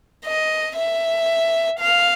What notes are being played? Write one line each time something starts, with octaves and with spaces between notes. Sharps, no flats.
D#5
E5
F5